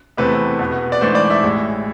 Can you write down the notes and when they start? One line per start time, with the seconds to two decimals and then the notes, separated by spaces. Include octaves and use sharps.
0.17 E2 C3 E3 A3 C4 B4
0.59 E2 B2 B3
0.92 D5
1.01 G#2 E3 A3 D4 C5
1.15 D5
1.30 E5
1.43 A1 A2 G#3